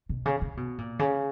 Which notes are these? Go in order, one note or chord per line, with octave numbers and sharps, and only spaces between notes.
B2
C#3
C#3
B2
A#2
C#3